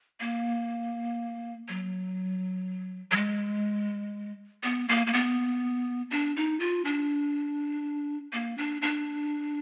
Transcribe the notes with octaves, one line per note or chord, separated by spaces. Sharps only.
A#3
F#3
F#3
G#3
B3
A#3
A#3
B3
D4
D#4
F4
D4
A#3
D4
D4